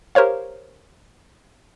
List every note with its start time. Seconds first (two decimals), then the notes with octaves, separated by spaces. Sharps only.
0.15 G4 A#4 C5 C#5 F5